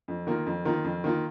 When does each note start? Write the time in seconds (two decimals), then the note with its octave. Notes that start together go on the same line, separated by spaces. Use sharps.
0.08 F2
0.27 D#3 A#3 F4
0.46 F2
0.65 D#3 A#3 F4
0.84 F2
1.04 D#3 A#3 F4